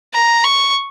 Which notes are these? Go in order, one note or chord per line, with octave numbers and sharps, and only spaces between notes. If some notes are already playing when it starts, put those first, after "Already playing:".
A#5
C#6